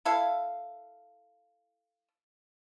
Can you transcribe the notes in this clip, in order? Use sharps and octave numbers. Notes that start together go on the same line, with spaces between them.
E4 A4 F5